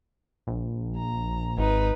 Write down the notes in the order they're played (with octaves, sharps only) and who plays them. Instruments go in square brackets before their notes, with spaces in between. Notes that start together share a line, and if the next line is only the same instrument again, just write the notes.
[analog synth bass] A#1
[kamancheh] A#5
[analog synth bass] G#1 [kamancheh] D#4 B4